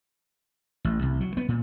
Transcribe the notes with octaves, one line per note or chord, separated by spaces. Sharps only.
A1
C2
F#3
B3
A#2